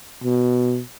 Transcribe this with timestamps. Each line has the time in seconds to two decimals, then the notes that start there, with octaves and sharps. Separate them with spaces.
0.24 B2